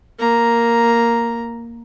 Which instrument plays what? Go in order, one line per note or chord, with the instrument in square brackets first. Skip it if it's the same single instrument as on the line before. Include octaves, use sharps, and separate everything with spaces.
[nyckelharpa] A#3 A#5